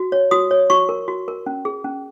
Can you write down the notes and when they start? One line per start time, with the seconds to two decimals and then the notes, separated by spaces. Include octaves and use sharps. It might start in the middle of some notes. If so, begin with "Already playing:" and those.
Already playing: F#4
0.12 C#5
0.31 F#4 D#6
0.51 C#5
0.70 F#4 C#6
0.89 A#4
1.08 F#4
1.28 A#4
1.46 C#4
1.65 G#4
1.84 C#4